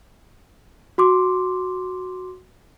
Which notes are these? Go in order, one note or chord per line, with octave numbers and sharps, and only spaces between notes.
F#4 C6 D6